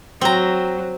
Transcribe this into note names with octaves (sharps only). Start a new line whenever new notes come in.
F#3 C4 A#5